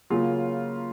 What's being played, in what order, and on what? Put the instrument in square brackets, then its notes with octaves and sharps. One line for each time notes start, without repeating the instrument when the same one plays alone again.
[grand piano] C#3 F#3 A#3 F4